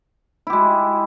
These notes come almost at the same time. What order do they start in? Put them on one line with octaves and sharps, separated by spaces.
E4 G4 G#3